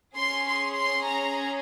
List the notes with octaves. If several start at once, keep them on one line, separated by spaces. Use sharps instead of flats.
C#4 G#4 C6
C6
C6
A#5